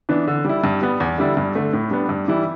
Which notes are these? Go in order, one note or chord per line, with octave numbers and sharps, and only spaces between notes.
E3 B3 D4
D3
G3 E4
G2
G3 B3
E2
D3 G3 E4
G2
D3 A3
A2
G3 B3 D4
G2
E3 G3 E4